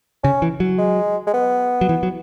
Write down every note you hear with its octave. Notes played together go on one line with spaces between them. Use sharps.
C#3 C#4
E3
F#3
G#3
G#3
B3
F#3
E3
F#3